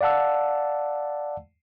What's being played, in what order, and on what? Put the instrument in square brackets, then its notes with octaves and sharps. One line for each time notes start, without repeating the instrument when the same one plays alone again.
[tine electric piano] D5 F5 F#5 A5 E6